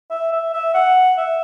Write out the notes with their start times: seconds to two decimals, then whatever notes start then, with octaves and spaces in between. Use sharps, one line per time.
0.11 E5
0.32 E5
0.54 E5
0.74 F#5
1.18 E5